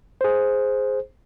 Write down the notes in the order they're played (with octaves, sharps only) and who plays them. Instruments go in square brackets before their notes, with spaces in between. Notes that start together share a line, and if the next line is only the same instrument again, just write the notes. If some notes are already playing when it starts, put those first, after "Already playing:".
[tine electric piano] G#4 C5